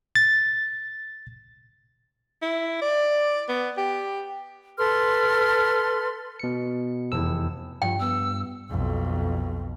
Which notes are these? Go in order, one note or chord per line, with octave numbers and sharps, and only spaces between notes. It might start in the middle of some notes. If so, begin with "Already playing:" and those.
A6
E4
D5
B3
G4
A4 B4 C6 F6
B2 C#7
F1 E2 E6
G2 F3 G5
B3 E6
B1 F2